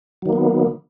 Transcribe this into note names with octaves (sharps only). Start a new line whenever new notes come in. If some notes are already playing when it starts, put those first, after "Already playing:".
D#3 F#3 A#3 B3